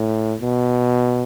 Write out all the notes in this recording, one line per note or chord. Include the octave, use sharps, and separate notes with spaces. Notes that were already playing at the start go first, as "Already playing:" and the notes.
Already playing: A2
B2